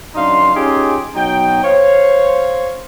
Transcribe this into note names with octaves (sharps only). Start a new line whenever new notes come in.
F#2 D4 D#4 F5 C6
C#4 D#4 F4 G4 G#4
B2 F#3 D#4 G5
C5 C#5 F5